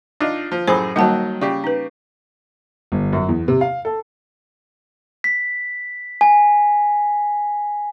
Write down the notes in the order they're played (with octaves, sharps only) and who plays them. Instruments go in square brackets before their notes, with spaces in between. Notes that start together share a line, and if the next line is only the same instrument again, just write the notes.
[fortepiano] D4 D#4 F4
F3
[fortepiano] F#2 A2 G#4 [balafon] C5 B5
[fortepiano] D#3 F#3 [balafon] G3 A#3 A5
[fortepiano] C#3 G4 [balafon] D5
[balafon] D#4 B4
[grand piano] G1
F#2
E2
C3
F5
A4
[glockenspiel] B6
G#5